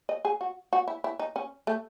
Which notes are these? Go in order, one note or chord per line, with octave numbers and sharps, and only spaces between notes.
D#5
G#4
F#4
F#4
E4
E4
D#4
C#4
A3